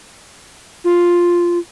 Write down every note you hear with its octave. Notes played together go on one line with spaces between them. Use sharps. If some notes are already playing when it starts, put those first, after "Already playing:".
F4